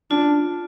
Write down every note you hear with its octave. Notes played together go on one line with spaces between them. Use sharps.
D4 F4